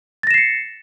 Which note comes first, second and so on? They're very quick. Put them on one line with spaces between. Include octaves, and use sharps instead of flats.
A6 A#6 E7 C7 C#7